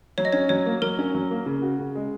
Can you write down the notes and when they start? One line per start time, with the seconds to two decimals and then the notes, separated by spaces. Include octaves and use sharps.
0.18 F#3 C#5
0.25 D#5
0.33 C#4 C#5
0.49 F#3 C#5
0.66 A#3
0.82 F#3 A#4
0.99 C#4
1.15 F#3
1.31 A#3
1.46 C#3
1.62 F#4
1.79 C#3
1.95 G#3